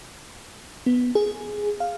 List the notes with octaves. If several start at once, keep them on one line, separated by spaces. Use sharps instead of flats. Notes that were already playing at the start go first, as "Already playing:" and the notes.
B3
G#4
F5